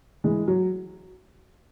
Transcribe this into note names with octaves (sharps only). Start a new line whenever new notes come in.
E3 G#3
F#3